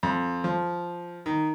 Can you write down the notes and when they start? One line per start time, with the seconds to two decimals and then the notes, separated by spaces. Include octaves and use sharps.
0.03 F2
0.44 F3
1.26 D#3